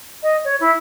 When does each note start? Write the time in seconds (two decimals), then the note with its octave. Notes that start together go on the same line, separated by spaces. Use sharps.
0.22 D#5
0.44 C#5
0.60 E4